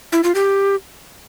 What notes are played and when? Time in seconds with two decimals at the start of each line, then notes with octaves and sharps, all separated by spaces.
0.12 E4
0.24 F4
0.35 G4